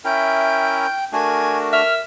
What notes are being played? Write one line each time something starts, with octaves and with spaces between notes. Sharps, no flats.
C#4 E4 A#4 E5 G5
A3 D4 F#4 A#4 G#5
E5 F6